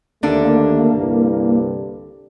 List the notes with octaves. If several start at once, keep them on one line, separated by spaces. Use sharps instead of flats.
D#2 D3 A3 A#3 D4
C2 G2